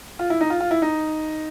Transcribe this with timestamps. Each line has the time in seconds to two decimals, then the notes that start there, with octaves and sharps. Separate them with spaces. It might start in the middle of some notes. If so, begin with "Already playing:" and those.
0.19 F4
0.30 E4
0.41 D#4
0.50 F4
0.60 F4
0.71 E4
0.82 D#4